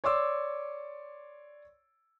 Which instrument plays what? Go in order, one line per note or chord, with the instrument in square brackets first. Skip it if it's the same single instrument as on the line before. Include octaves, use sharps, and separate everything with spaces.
[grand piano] C#5 D5 C6 D6 E6